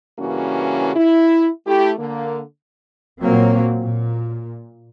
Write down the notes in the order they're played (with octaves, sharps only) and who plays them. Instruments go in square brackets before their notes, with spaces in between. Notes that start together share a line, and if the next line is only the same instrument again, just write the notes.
[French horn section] G2 C#3 E3 A#3 C#4 F#4
E4
A3 E4 G4
D3 A#3
[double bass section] A#2 F#3 A#3 C4
A#2